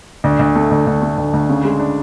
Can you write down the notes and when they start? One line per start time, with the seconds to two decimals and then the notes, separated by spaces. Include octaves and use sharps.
0.24 D2
0.39 D2
0.55 A3
0.71 D2
0.87 D2
1.02 A3
1.18 D2
1.33 D2
1.49 C#3
1.64 G#3
1.80 D4